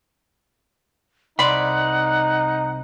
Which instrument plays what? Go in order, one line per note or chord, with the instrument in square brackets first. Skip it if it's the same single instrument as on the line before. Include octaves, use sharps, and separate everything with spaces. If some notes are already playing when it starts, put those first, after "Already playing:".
[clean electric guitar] C2 D5 [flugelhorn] D#4 [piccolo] F#5 [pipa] B5 C6